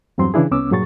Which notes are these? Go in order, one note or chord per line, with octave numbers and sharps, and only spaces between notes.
E2 G2 F#3 C4 C6
C#3 E3 D4 E4 G#4
C2 B3 C#4 D6 E6
G2 A#2 F#3 G#4 C#6 A6